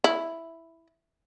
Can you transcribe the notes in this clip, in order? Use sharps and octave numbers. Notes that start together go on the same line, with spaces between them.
E4